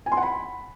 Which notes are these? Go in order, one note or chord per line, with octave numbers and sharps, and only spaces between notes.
G#5
C6
F#5
B5